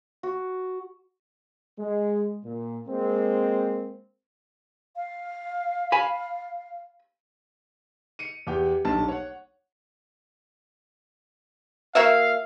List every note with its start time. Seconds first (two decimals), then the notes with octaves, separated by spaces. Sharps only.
0.23 F#4
1.78 G#3
2.44 A#2
2.87 G#3 A#3 C4
4.96 F5
5.92 G#5 B5
8.19 C#7 D#7
8.47 E2 G4 G5
8.85 D#1 B1 D4 A5
9.08 C#5 F#5
11.95 A#3 F#4 E5 F5